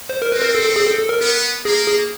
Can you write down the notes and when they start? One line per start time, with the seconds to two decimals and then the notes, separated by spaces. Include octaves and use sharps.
0.09 C5
0.22 A#4
0.32 C4 B4
0.42 A#4
0.55 A4
0.66 A4
0.76 G#4
0.87 A4
0.98 A4
1.09 A#4
1.20 B3 A#4
1.65 A#3 G#4
1.87 G#4